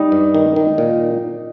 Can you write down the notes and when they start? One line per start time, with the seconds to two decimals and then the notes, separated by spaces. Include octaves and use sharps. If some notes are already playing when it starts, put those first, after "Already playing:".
Already playing: G3 D#4
0.12 G2
0.34 D#3
0.56 D#3
0.78 A#2